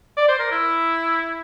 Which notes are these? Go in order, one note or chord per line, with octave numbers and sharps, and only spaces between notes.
D5
C5
A#4
E4